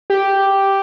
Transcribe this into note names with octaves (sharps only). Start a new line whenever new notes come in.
G4